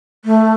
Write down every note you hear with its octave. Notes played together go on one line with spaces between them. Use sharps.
A3